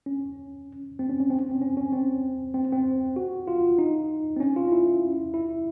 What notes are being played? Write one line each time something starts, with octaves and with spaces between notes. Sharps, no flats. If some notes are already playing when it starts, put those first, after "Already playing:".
C#4
C4
C#4
C#4
C4
C#4
C4
C#4
C#4
C4
C4
C4
F#4
F4
D#4
C4
C#4
F4
E4
E4